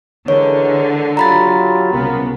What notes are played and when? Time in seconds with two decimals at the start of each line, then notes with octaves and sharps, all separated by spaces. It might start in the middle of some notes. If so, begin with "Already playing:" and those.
0.28 D3 E3 G#3 A#4 C#5
1.17 F#3 F4 G4 A#5 B5 A6
1.92 C2 C#3 B3 A#4